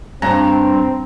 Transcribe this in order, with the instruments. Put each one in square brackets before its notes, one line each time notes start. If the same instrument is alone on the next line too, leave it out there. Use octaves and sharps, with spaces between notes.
[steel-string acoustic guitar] G2 [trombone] C4 [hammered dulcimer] A#5